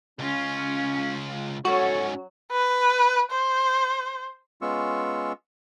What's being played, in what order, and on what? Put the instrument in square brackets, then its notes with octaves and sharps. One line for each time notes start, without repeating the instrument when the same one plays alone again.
[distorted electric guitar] C#2 F4 [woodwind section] C#4
[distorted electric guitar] G#2 C#4 [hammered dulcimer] F#3 [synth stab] F#4 [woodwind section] A4 C#5
[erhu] B4
C5
[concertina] G#3 B3 C#4 F4 C#6 E6